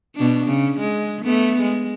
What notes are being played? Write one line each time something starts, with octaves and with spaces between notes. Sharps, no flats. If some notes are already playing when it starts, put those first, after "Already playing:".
B2 D4
C#3
G#3
A3 B3
G#3